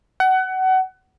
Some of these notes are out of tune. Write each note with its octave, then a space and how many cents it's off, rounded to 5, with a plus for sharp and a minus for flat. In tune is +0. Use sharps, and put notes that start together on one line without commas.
F#5 +25